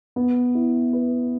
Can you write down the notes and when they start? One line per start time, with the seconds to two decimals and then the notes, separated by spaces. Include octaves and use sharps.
0.16 B3
0.55 E4
0.93 B4